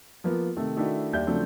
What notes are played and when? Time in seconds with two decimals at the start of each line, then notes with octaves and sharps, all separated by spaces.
0.24 F3 A#3 B3 F4
0.57 C3 D#3 A3
0.77 D#3 A3 D4 E4 F#4
1.13 D#2 G3 D5 E5 G6
1.27 C#3 F3 F#3 A3 C4 D4